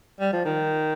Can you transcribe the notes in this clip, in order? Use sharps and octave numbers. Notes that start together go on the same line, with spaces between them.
G3
F3
D#3